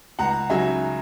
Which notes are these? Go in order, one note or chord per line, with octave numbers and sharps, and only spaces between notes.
C#2 F#5 A#5
C#3 F#3 E5 G#5